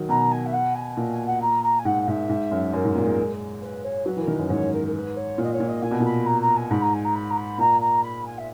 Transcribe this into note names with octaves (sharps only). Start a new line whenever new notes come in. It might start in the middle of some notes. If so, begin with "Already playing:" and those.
Already playing: D#3 F#3
B2 A#5
G#5
E5
F#5
G#5
A#2
G#5
F#5
A#5
A#5
G#5
G#2 F#5
G#2 E5
G#2
F#2
F#2 A#4
G#2
A#2
G#3
B4
C#5
F#3 B4
E3
A#4
D#3
F#2 B4
G#2 C#5
A#4
A#4
B4
C#5
A#2 D#5
C#5
A#2
D#5
A#2 G#5
B2
A#2 B5
A#5
A#5
G#5
G#2 B5
A#5
G#5
A#5
B5
A#5
B5
A#2 A#5
A#5
B5
G#5
E5